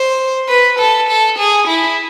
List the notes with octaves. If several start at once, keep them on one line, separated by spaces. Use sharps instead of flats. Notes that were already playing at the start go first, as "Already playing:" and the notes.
Already playing: C5
B4
A4
A4
G#4
E4